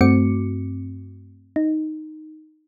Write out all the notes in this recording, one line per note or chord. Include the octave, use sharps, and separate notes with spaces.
G2 A3 C4 F#4 D6 C#7
D#4